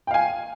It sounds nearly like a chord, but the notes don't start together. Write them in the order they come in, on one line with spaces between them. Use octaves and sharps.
G5 F5 G#5